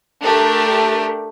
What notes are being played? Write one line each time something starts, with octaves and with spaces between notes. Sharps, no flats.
A3 D4 G4 A#4